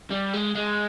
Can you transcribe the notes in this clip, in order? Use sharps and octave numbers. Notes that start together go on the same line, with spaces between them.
G3
G#3
G#3